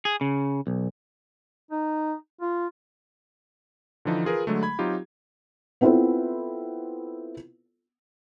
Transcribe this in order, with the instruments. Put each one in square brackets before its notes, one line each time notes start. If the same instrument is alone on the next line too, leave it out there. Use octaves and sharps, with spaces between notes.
[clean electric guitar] G#4
C#3
B1
[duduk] D#4
F4
[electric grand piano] D3 E3 F3 D#4
F4 G#4 A#4 B4
D3 F#3 G#3 A3
B5 G#6
F#3 C4 D#4 F4 G4
[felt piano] B3 C4 E4 F4 A4 B4